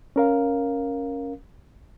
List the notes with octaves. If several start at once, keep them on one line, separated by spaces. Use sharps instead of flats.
C#4 A#4 F5